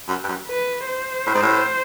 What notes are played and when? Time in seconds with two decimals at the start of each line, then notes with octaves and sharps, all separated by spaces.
0.08 F#2
0.24 G2
0.28 F#2
0.47 B4
0.86 C5
1.26 A2
1.35 G#2
1.42 A2